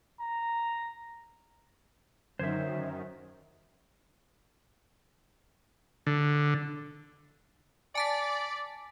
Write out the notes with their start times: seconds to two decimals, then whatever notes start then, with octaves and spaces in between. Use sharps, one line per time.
0.20 A#5
2.39 F#2 D3 D#3 C5 E5 G#6
6.07 D3
7.95 D5 G#5 A5 B6